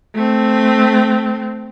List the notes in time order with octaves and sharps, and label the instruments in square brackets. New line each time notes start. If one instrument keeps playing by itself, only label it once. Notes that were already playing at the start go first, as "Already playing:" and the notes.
[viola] A3 C4